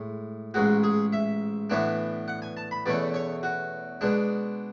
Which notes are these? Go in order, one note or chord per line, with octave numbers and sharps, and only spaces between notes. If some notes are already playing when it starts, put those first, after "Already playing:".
Already playing: A2 G#3
A1 G#2 G#3 F#4
G#4
E5
A2 E3 B3 D4
F#5
G#5
A5
B5
E2 B2 A3 C#4 D5
C#5
F#4
B2 G#3 D4